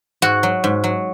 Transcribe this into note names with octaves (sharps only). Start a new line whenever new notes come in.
G#2 F#4
F#3
G#2
F#3